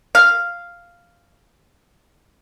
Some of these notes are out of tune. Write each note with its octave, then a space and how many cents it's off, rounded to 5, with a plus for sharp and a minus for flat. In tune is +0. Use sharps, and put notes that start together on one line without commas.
F5 -5